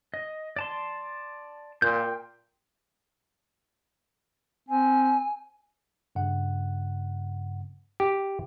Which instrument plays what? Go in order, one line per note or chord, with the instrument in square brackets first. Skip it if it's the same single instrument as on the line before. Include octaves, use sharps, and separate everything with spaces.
[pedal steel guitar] D#5
D5 A5 C6
[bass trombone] A#2 [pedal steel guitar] G5 C6 G6
[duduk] C4 [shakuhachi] G#5
[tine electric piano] G2 C#3 F#5
[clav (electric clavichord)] G4